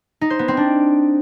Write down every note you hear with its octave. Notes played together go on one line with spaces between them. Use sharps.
D#4
C5
B3
C4
D4